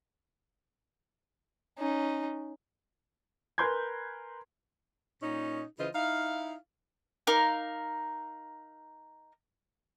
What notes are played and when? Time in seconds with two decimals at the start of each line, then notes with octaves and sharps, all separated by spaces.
1.79 C#4 D#4
3.58 A#4 B4 G#5 C6 G6 G#6
5.22 A#2 C#4 D#4
5.79 C#3 E3 F4 C5 D#5
5.95 D#4 E4 F5
7.27 D#4 A#4 F5 D6